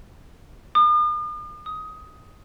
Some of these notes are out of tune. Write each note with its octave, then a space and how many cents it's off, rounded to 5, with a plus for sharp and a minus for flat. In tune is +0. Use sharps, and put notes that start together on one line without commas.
D#6 -45
D#6 +15